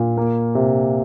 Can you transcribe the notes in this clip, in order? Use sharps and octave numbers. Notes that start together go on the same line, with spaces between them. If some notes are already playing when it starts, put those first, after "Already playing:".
Already playing: A#2
A#3
C3